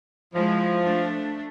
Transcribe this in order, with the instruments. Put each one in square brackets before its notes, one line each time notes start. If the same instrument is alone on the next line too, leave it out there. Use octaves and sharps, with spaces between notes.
[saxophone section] F3 [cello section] G#3 E4
[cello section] A3 D4